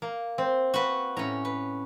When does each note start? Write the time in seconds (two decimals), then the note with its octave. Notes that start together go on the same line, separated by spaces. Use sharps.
0.02 A#3
0.38 C4
0.74 F#4 B4
1.17 A2 C#4 A#5
1.45 B4